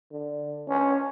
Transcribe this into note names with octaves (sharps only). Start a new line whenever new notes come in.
D3
C#4